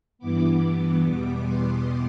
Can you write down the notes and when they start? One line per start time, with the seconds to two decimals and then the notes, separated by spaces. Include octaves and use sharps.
0.19 G2 E3 B3 D6
1.02 E2 B2 G3 B3 D6
1.43 C6